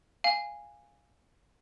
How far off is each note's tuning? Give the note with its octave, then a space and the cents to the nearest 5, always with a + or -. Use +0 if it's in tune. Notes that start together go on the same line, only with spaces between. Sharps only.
F5 +0 G#5 -10